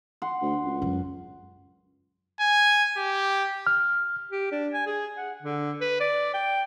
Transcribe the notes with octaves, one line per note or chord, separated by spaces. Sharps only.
F#5 C6
D2
C#2
F#2
G#5
G4
F6
G4
D4
G#5
G#4
F#5
D3
B4
D5
G5